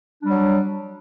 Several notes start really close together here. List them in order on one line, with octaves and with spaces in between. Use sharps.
D4 G3 F#3